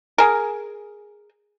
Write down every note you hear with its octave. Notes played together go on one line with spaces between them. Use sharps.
G#4 A#4